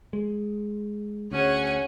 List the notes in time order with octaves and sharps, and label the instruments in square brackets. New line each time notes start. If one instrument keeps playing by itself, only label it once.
[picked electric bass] G#3
[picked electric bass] D2 [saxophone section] C#4 [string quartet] G#4 F#5 G#5